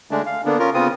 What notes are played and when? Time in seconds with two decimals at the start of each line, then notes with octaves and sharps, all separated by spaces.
0.11 D3 G#3 A3 D4
0.26 F5
0.45 D3 A#3 B3 D4
0.59 C#4 F4 A#4
0.74 C#3 B3 C4 F4 D#6